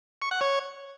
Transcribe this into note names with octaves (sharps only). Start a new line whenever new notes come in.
C#6
F#5
C#5